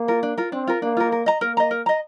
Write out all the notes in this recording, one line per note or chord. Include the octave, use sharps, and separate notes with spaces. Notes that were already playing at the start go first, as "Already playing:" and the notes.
Already playing: A#3
F4 A#4
D4
F4 A#4
C4 D4
F4 A#4
A#3 D4
F4 A#4
A#4
D#5 A#5
A#3 A#4
D#5 A#5
A#4
D#5 A#5